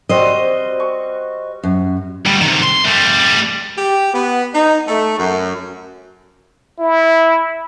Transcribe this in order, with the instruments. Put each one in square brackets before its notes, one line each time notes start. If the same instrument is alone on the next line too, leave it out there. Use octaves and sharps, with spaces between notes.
[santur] G3 C4 F#4 [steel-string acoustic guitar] C5 D#5
[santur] C#6
[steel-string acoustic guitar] F#2
[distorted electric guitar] D2 G3
C3 D#3
C6
G3 A3
[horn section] G4
B3
D#4
A3
F#2
[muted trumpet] E4